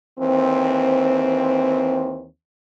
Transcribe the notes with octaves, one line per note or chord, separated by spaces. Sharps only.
D#2 E3 C4